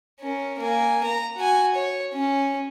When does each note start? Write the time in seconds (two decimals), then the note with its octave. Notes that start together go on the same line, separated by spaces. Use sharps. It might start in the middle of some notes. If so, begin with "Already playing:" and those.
0.20 C#4 A#4
0.59 A#3 G#5
1.04 A#5
1.36 F#4 G#5
1.75 C#5
2.13 C#4